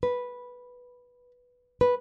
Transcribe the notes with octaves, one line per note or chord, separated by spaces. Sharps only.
B4
B4